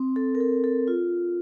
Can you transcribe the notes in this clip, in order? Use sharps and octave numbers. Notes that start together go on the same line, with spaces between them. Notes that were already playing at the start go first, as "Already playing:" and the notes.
Already playing: C4
A4
A#4
A4
A4
F4